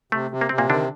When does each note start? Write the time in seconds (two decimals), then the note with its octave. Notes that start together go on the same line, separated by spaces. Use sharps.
0.12 C3 A3
0.31 C3
0.41 A#3
0.49 C3 C4
0.58 A#2 A#3
0.69 D3 D#3 D4